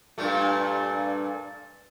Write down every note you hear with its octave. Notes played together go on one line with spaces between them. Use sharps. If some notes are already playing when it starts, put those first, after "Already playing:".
G2 A#2 A3